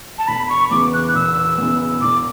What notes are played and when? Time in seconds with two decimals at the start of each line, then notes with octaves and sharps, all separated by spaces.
0.18 A5
0.28 E1 B5
0.50 C#6
0.71 E2 C#3 E3 B3 D6
0.93 F#6
1.14 E1 E6
1.58 E2 C#3 E3 B3
2.01 E1 D6